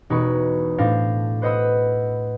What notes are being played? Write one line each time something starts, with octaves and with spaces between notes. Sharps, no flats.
E1 D#4 B4 B5 C#6
A2 D4 C5 F5 A#6
B4 C5 D#5 F#5 B5 E6